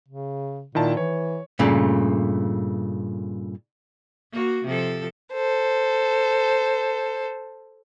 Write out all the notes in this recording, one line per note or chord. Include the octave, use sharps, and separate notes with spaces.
C#3
A#2 D#3 E4 A5
E3 C#5
G2 A#2 C#3 A3
A#3 F#4
C3 F3 A4
A4 C5